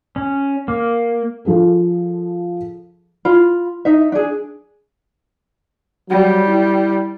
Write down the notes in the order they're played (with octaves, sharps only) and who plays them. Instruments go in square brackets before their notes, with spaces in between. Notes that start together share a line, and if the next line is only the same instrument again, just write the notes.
[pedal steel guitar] C#4
A#3
[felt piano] F3 G#4 A4
[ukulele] F4 B5
D#4 E5
D4 G#4
[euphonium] F#3 [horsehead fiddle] G3
[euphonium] E4